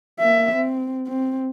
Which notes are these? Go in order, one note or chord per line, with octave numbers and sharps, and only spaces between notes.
A#3 E5
C4
C4